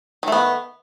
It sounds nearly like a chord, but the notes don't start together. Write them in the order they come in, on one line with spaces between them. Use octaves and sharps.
D#3 A3 B3